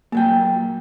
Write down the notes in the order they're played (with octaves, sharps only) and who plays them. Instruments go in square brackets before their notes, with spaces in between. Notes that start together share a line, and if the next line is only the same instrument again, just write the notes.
[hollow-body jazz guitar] A#2 F#3 G5 [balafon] A#3